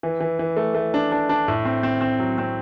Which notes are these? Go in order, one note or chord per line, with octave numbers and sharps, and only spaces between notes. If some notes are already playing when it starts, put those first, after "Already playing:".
E3
E3
E3
A3
A3
D4
D4
D4
A2
C4
C4
C4
F#3
C4